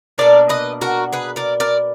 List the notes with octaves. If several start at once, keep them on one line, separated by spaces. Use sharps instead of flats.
B2 A#3 D4 A#4 D5
B4 D#5
F#4 A#4
G#4 B4
A#4 D5
A#4 D5